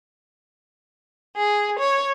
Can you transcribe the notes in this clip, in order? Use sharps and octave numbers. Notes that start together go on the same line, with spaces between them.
G#4
C#5